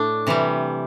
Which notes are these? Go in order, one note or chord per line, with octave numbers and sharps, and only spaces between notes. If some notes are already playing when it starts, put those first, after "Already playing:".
Already playing: A2 A3 D4
C3 E3 G3